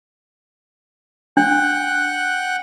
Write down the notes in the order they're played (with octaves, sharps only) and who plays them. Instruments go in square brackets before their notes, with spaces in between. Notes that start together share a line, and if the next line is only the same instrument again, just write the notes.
[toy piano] D4 [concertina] F#5 G5 F#6